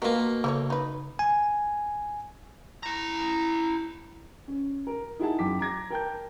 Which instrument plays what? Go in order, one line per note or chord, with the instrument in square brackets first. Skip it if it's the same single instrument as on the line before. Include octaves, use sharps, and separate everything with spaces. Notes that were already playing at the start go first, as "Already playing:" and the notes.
[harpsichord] B2 A#3 [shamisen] F4 A#4
[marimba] C#3 [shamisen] A3 A#4 C#5
[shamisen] D#4 B4
[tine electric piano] G#5
[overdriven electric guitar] E4 A#5
[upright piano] C#4
A#4
D#4 E4 G#4 F#5 A5
F#2 G5 D6 B6
A#5 D6 G#6 A#6
A#4 G5 A5 G6